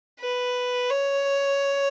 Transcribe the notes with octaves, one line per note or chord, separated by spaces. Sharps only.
B4
C#5